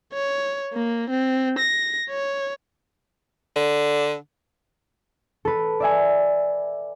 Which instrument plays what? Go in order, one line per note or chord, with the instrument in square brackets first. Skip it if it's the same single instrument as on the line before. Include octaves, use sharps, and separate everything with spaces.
[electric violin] C#5
A#3
C4
A#6
C#5
[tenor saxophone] D3
[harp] A4 B4
D5 E5 G#5